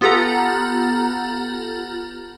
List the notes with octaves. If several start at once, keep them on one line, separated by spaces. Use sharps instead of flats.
B3 F4 G4 A4 F#5 A#5